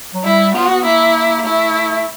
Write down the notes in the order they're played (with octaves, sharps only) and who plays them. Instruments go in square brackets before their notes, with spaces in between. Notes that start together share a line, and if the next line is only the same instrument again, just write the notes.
[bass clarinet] F#3
[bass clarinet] G3 [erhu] E4
[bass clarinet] B3 [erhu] F#4
[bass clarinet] B3
[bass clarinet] A#3 [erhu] E4
[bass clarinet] A3 [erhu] E4